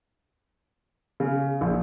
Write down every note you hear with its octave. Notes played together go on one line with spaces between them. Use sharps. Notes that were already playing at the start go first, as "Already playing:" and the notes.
C#3
A#1